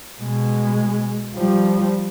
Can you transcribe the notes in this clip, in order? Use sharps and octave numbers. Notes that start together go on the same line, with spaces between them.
B2 G#3
F3 G3